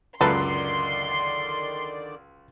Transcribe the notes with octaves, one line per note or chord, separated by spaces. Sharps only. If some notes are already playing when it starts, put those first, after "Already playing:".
C#2 F#2 D3 D#3 A4 B4 D5 C6